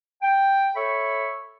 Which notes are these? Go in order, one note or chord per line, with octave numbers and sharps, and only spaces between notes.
G5
A4 C#5 E5 B5 C#6